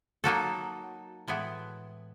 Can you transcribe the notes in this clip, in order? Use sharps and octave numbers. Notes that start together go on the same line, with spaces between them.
F#3 A#3 D#4 F#4 A4
A2 E3 G#3 B3 E4